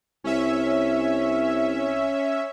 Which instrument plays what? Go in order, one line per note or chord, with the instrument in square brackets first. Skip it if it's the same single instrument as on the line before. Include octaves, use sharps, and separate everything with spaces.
[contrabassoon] C2 [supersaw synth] C#4 E5